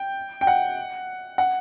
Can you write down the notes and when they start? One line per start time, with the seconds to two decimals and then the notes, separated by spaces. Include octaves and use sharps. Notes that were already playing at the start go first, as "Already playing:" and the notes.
Already playing: G5
0.41 G5
0.47 F#5
1.38 F#5